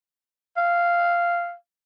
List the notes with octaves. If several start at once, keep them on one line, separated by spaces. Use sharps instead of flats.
F5